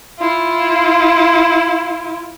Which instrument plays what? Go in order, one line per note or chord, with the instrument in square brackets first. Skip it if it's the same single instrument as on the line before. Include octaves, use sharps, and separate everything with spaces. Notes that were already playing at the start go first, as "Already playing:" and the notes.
[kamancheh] E4 F4